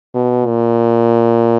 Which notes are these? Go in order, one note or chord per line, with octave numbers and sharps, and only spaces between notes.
B2
A#2